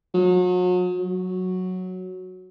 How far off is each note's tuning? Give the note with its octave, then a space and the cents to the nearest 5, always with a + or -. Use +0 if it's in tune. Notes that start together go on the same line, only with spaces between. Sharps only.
F#3 -40
F#3 -5